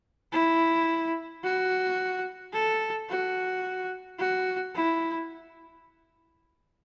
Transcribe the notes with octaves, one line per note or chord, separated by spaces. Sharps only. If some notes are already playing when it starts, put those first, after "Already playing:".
E4
F#4
A4
F#4
F#4
E4